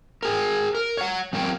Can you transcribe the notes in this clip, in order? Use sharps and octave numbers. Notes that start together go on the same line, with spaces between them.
G#4 A#4
A#4
C#5 F#5
F#3 C4 A#4 C#5 G5